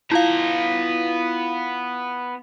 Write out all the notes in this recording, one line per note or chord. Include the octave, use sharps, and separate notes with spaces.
B3 E4 F4 F5 A#5